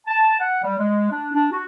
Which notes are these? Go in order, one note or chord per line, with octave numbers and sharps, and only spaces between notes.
A5
F#5
G3
G#3
D4
D4
F#4